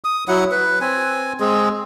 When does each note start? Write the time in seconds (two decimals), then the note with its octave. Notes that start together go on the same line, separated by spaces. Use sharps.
0.04 D#6
0.28 F#3 E4 F#5
0.51 B4
0.81 C4 G#5
1.40 G#3 C4 G#4